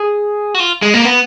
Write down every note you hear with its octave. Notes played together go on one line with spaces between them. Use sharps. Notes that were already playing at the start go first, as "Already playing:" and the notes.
Already playing: G#4
F#4
F4
G#3
A#3
B3